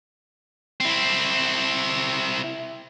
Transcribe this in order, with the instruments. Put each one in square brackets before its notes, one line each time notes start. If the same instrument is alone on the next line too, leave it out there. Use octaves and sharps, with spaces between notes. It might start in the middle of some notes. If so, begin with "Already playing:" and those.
[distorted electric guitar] C4 E4